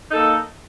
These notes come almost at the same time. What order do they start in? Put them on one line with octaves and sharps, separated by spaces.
D#4 A4 A#3